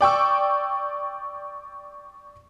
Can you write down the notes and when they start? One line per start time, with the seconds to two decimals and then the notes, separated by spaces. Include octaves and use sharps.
0.01 D5 G5 C#6 E6